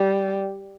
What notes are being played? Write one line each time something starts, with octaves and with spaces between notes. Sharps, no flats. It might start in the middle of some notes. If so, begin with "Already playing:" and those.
Already playing: G3